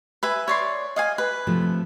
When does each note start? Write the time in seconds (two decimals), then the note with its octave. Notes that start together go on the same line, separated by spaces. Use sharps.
0.23 B4 E5 G#5
0.48 C#5 D5 C6
0.96 D#5 F5 G#5
1.18 B4
1.47 C3 F3 A3